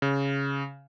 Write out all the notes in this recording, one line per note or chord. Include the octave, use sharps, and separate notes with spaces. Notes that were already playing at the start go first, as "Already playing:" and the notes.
C#3